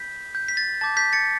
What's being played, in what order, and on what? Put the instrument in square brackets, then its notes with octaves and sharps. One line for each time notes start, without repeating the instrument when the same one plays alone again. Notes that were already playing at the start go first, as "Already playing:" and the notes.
Already playing: [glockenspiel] B5 G6 B6
G6
B6
A6
A5 D6 G6 A6
G6 B6
A6 C#7